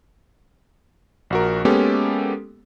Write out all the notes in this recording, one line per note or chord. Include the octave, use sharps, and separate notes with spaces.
A#1 F#4 A#4
G#3 A#3 B3 C#4 G4 A4